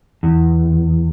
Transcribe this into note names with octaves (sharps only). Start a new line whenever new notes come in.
E2